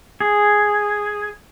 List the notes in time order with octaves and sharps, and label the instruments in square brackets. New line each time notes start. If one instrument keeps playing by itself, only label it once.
[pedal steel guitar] G#4